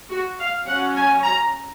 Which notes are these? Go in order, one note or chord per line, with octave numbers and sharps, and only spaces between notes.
F#4
F5
F#3 C#4 F#5
G#5
A#5